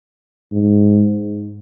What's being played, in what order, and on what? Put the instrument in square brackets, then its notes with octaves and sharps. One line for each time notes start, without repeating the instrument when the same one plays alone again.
[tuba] G#2